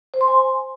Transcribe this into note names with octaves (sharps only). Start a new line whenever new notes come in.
C5
C6
G#5